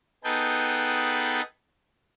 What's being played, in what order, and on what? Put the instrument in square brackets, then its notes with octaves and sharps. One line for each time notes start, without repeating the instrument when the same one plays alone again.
[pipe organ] B3 D#4 G#4 A4 B4 G5